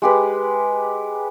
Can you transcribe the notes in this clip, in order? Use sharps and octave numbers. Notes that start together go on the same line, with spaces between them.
G#3 G4 B4